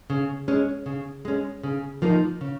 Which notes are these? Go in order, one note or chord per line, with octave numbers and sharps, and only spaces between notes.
C#3
G#3 C#4
C#3
G#3 C#4
C#3
F3 A#3 D#4
C#3